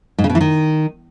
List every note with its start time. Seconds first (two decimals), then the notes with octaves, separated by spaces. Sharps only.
0.18 G#2
0.24 C#3
0.30 B2
0.35 E3
0.41 D#3